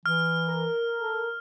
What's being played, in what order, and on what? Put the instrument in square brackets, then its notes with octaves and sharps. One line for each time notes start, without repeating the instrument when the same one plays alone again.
[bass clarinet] E3 [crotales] F6
[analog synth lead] A#4
[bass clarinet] A4